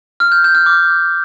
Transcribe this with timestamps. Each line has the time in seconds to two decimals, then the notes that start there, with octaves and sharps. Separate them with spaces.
0.20 F6
0.32 G6
0.44 G6
0.55 F6
0.66 D6